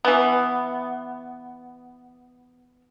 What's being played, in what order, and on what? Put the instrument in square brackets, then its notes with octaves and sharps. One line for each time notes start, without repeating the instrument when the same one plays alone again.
[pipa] E3 B3